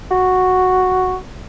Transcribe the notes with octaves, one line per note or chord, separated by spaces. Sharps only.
F#4